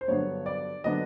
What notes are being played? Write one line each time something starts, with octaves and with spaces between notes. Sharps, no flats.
C5
G2 D3 F#3 B3 D4 C#5
D5
D3 F#3 B3 D4 D#5